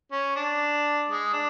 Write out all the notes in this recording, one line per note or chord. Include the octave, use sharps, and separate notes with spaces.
C#4
D4
G#3
D4